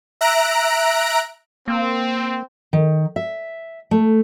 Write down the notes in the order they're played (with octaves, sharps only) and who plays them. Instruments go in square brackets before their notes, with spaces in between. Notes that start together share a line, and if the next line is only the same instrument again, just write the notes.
[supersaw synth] E5 A#5 F#6 A#6 D7
[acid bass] A#3 [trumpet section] C4
[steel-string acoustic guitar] D#3
E5
A3